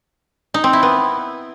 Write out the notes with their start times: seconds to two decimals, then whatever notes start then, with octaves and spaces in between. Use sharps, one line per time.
0.54 D#4
0.64 C4
0.73 E4
0.83 B3